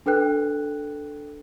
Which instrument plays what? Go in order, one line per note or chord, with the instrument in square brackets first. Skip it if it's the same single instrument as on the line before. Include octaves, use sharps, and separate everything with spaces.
[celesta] D4 A4 B4 G5 F#6